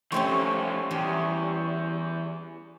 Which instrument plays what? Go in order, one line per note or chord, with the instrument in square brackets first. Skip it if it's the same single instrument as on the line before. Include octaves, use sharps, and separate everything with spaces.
[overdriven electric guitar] F3 A3 [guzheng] G3 C4 C#4 [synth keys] C6 C#6
[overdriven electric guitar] E2 [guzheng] G3